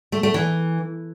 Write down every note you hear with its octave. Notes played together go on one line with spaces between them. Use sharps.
A3
A3
E3